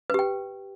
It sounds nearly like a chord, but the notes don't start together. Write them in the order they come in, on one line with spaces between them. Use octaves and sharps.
B4 G4 G5